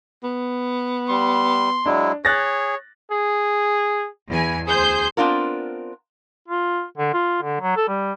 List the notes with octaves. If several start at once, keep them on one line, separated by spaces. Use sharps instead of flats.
B3
G3 C6
F#3 G#3 D4 E4
G#4 C#5 F#6 A6 A#6
G#4
E2 G#5
D2 G#4 C5 G6
B3 C4 D4 F4 A#4
F4
D3
F4
D3
F#3
A4
G3